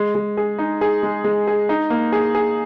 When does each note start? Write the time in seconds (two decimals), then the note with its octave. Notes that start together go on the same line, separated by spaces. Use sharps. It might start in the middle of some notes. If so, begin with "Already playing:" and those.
Already playing: G#3
0.15 G#3
0.37 G#4
0.58 D#4
0.81 G#4
1.03 G#3
1.24 G#3
1.47 G#4
1.69 D#4
1.90 A#3
2.12 G#4
2.35 G#4